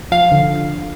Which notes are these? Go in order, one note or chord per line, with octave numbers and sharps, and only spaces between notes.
F3 F5
D3